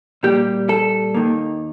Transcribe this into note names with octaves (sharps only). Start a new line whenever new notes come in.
A#2 G3 A#3 G4
A4
D#2 D#3 A#3